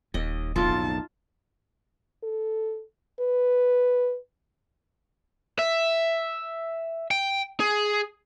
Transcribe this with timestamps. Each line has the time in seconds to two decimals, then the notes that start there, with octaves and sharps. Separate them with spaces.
0.14 D#1 D#2 D#5
0.56 B1 F2 A2 D#4 F4 A5
2.23 A4
3.20 B4
5.59 E5
7.11 G5
7.60 G#4